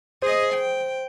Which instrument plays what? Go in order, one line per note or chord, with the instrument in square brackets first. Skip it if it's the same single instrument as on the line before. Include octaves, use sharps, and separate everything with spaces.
[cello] G#4 D#5 [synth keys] C5
[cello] G5